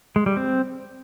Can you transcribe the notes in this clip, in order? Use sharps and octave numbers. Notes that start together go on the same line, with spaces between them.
G#3
G3
C4